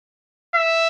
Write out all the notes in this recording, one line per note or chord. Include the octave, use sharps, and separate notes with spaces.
E5